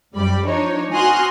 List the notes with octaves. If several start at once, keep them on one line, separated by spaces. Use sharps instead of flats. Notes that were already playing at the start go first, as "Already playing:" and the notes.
F#2 G3 D5 B5
F3 D4 D#4 C#5
F#4 G#5 C6 D#6 F6 F#6